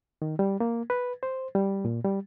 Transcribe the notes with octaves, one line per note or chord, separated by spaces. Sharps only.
D#3
G3
A#3
B4
C5
G3
A#2
G3